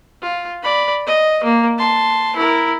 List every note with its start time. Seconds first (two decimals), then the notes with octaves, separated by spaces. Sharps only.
0.22 F4
0.63 D5 B5
1.07 D#5
1.44 A#3
1.78 A5 C6
2.36 E4 A#4